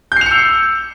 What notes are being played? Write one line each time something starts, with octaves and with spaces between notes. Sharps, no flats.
E6 G6 C7 C#7 F7